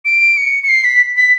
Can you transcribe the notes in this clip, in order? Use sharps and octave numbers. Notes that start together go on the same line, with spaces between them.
D7
C#7
C#7
C7
B6
B6